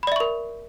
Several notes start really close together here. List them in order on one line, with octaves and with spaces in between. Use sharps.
B5 D5 E5 C#6 A#4